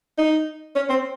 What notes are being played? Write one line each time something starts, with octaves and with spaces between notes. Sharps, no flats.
D#4
C#4
C4